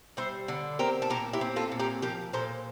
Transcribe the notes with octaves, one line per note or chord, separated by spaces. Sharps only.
G3 C5 E5
D3
C4 G4 A#4
A4
A#2 G4 A#4
E4 G4
C4
F4 A4
A#2
G4 A#4
F3 G4 A#4
A#2 A4 C5